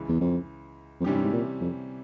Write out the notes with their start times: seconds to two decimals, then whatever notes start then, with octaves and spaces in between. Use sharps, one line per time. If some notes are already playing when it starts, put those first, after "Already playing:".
Already playing: C#2 C#3 E3
0.09 E2
0.21 F2
1.00 F2
1.04 G2 C3 E3 G3 C#4 G4
1.15 G2
1.24 G#2
1.33 A#2
1.61 F2